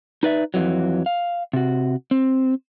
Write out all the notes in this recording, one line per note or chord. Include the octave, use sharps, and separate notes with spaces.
D#4 B4 D5 E5
F2 E3 F#3
F5
C3 F#4
C4